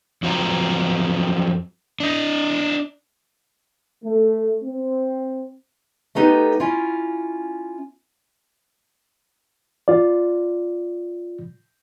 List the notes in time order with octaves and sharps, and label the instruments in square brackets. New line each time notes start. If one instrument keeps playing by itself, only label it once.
[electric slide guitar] F2 F#3 C4 D4 F4 A#5
D4 D#5
[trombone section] A3
C4
[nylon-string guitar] A3 B3 D#4 G4 A4
C#4 E4 F4
[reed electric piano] F4 D5